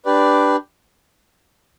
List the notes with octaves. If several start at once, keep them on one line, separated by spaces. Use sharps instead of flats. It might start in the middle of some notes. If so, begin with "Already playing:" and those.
D4 G4 B4 D5